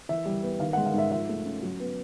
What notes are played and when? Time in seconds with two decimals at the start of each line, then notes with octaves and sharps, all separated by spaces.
0.09 E3 E5
0.26 G3
0.43 B3
0.60 D#3 F5
0.73 F#5
0.77 G#3
0.86 F5
0.94 G#2 E5
1.11 F3 E5
1.29 A3
1.45 C#4
1.63 F#3
1.80 B3